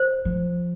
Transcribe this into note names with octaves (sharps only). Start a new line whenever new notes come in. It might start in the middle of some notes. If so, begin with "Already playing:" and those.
Already playing: C5
F3